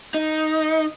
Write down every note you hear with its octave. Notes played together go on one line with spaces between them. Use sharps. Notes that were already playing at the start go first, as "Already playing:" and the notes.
D#4